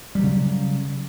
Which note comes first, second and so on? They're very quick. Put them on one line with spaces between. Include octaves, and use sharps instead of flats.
G3 F#3 C#3